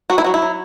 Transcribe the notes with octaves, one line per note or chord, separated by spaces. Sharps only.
F#3 F#4
E4
F#3 F#4
E4
F#3